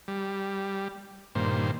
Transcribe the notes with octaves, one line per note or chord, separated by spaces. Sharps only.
G3
G2 A#2 D#3 C5